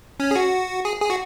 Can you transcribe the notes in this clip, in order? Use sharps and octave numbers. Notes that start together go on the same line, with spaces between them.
C#4
G#4
F#4
G#4
G#4
F#4